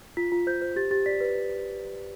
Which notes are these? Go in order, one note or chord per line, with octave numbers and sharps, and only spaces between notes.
F4 B6
F4
C5 G6
C5
G4 A6
G4 A6
D5 B6
B4